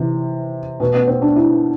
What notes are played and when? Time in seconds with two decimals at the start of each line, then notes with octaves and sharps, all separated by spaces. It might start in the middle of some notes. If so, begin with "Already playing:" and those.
Already playing: C3 E3
0.80 B2
0.94 B3
1.08 C4
1.22 D4
1.36 E4